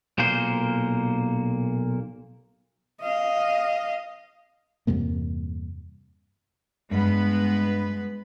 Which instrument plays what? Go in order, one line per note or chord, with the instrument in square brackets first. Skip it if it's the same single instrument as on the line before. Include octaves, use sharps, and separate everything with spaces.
[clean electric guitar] B1 A#2 A#3 C5
[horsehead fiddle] D#5 F5
[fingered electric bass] E2 G2 C3 A#3
[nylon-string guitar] G2 [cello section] G#3 B3 B4